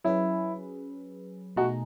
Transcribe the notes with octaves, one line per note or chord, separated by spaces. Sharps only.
F#3 C#4 E4 G#4 B4
B2 A3 D#4 F#4 G#4